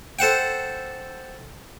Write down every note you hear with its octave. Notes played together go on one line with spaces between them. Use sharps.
A4 C5 F#5 G5